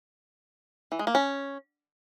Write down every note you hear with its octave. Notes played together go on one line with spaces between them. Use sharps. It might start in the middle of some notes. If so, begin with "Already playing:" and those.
E3
G#3
A#3
C#4